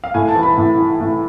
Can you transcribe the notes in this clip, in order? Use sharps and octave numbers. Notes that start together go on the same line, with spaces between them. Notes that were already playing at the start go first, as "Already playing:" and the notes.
F5
A2 G#5
A5
E3
B5
A2
E3
A2